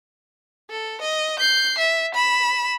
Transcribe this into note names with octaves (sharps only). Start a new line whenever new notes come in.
A4
D#5
G6 C7
E5
B5 E7